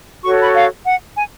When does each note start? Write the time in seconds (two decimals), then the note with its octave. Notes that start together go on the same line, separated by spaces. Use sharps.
0.24 F#4 A4 C#5 C#6
0.40 B5
0.55 F5
0.85 F#5
1.17 G#5